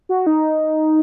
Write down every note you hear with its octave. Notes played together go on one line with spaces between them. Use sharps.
F#4
D#4